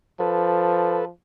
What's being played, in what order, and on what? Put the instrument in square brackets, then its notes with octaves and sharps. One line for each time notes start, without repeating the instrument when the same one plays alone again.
[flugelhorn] F3 [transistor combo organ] A4 B4